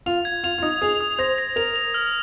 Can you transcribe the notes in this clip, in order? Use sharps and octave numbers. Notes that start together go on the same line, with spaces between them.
F4 F7
G#6
F4 F7
F4
D#4 D#6
G#4 D#6
D#6
C5 A#6
A#6
A#4 F7
F7
F6